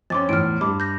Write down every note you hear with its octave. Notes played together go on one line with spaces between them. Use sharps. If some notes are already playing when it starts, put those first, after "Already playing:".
F2 C#4 C6 D6 A6
E2 A2 F6 D7
G2 B5 D6
G6 A#6